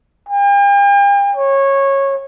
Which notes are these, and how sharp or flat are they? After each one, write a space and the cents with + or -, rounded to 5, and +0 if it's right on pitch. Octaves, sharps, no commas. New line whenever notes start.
G5 +45
C#5 -15